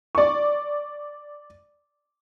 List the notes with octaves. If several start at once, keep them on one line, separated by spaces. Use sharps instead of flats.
D5 C#6